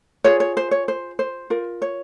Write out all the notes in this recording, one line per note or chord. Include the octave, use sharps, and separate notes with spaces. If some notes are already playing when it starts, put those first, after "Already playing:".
F4 G#4 C#5
C#5
C5
C#5
C5
C5
F4 A#4
C#5